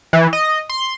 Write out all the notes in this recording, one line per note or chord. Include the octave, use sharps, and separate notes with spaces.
E3
D#5
C6